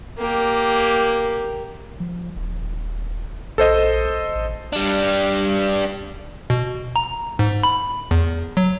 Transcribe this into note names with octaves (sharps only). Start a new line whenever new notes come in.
A#3 G4
F3
D#1
A#1 A4 C5 D#5
A1
G3 D4
B2
A#5
G#2
B5
E2
F#3